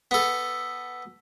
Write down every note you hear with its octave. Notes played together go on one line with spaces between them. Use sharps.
B3 A4